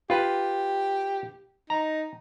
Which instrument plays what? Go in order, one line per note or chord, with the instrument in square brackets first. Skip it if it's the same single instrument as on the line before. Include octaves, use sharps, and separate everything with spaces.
[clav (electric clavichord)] F4 B4 [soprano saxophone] G4
[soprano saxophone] D#4 [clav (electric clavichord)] A#5